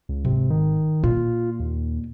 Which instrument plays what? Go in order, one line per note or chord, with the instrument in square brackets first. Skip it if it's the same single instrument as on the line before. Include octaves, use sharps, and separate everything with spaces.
[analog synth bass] C#2
[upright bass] G#1 [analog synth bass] C3
[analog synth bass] D#3
[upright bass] A#2 [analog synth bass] F4
[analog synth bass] D#2